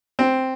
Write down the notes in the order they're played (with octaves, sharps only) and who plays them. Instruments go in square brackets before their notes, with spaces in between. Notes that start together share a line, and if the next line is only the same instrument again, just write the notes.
[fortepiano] C4